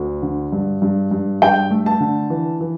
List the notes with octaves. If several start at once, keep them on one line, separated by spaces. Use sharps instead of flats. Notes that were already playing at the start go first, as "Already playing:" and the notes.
Already playing: D2
D3
G2
G2
G2
G2 G5
A3
A5
D3
E3
E3